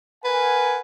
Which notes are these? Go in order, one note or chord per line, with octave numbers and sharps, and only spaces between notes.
A#4 B4 F#5 G#5